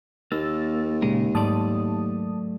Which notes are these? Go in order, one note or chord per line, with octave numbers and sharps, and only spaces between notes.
D#2 A#3 E6 A6
A#2 C#3 G#3 A#4
G#2 F#3 A3 D5 A5 D#6